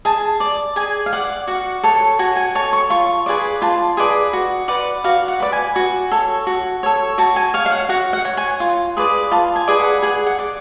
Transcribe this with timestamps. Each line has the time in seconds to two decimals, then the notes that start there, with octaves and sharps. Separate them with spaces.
0.05 G#4 A5
0.40 D5
0.76 G#4 G#5
1.06 F5
1.13 D5 F#5
1.48 F#4 F#5
1.83 A4 C#5
2.19 F#4 G#5
2.36 G#5
2.55 A4 C#5 A5
2.73 C#6
2.90 F4 C#6
3.26 G#4 B4 D5
3.62 F4 A5
3.97 G#4 B4 D5
4.33 F#4
4.68 B4 D5 F#5
5.04 F#4 F5
5.28 F#5
5.40 B4 D5
5.52 G#5
5.76 F#4
6.11 A4 C#5
6.47 F#4
6.83 A4 C#5
7.18 F#4 A5
7.36 G#5
7.54 C#5 F5
7.66 F5
7.72 F#5
7.89 F#4 F#5
8.13 F#5
8.25 C#5
8.37 G#5
8.60 F4
8.97 G#4 B4 D5
9.31 F4 A5
9.56 G#5
9.68 G#4 B4 D5
9.80 F#5
10.03 G#4 F#5
10.26 F#5
10.39 D5